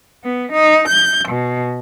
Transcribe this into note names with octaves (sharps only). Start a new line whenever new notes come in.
B3
D#4
G6
B2